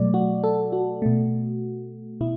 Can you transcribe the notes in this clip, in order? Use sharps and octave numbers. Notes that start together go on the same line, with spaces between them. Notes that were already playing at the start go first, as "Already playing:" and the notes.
Already playing: B2 F#3 A3 D5
F#4
A4
F#4
B2 A3
B2 E4